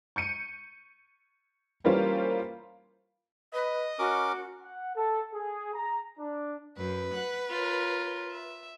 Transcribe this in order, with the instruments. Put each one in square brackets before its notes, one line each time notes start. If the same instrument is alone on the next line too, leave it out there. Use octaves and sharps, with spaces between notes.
[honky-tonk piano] C#6 G6 C#7 D#7
E3 G3 A#3 C#4 F4 C5
[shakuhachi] B4 [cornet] D#5
[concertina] C#4 A#4 D6 [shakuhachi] F#4
[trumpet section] F#5
A4
G#4
A#5
D4
[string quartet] F#2 [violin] B4
[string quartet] F#5 F#6
F4 A#4 C#5
E5